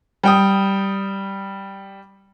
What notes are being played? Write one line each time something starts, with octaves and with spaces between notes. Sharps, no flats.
G3 G5 D#6